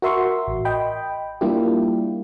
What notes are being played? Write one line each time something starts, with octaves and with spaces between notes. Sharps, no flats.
F#4 A#4 E5 C6 C#6
A1
D#5 G5 B5
G3 A#3 D4 E4 F4 G4